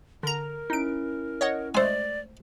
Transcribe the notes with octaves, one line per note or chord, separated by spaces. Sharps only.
D3 A#4 A#5
C#4 D#4 E4 D7
C#5 D#5 F#5
G#3 A3 C5 D5 G#5